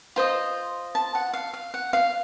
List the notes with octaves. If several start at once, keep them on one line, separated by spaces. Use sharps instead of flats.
F4 C5 D#5
A5
F#5
F5
F5
F#5
F5